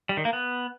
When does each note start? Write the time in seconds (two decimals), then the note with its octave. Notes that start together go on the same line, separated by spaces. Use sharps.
0.09 G3
0.17 D#3
0.25 A#3
0.33 B3